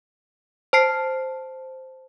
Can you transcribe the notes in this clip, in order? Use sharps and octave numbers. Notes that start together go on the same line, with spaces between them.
C5 A5 C7